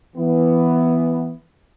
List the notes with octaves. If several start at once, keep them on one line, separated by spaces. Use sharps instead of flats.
E3 B3